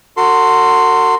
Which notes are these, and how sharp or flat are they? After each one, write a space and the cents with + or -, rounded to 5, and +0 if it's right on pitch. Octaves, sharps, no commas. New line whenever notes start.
F#4 +0 A4 +45 C6 +0